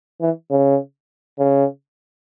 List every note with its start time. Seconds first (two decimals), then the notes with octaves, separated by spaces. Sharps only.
0.21 E3
0.51 C#3
1.38 C#3